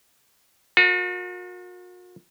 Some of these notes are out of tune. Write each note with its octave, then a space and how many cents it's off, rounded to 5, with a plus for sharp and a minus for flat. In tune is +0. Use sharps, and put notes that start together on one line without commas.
F#4 -45 A#4 -20